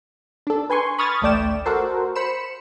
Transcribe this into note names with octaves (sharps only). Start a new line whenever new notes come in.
D4 A4
B4 G#5 C6 C#6
B5 C#6 D#6 F6 G#6 A6
A1 D2 A3 D5 G5 E7
F#4 A4 A#4 C5
C5 B5 C#7 E7